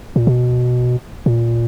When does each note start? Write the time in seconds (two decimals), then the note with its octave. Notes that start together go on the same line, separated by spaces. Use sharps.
0.16 A#2
0.27 B2
1.26 A#2